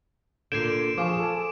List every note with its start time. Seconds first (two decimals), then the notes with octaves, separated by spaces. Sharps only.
0.52 A#2 D3 G6 G#6 C7 D7 E7
0.98 F3 F4 G#4 C#6 D6
1.20 A4 G#5